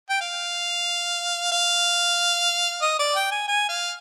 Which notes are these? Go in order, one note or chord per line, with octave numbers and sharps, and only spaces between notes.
G5
F5
F5
D#5
D5
G5
G#5
G#5
F5